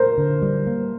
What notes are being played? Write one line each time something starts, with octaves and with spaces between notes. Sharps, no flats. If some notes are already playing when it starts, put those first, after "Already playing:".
Already playing: A#4 C5
D3
G3
A#3